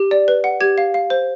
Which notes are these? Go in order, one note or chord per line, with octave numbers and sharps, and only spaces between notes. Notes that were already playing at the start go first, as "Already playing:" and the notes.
Already playing: G4
D5
B4
F#5
G4 G#6
F5
F5
C5